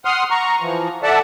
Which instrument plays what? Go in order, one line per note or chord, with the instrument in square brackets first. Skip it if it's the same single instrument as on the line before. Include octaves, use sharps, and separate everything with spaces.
[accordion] F#5 C6 D#6 F6
A#5 C#6
E3 F3
A4 D5 E5 F#5 A5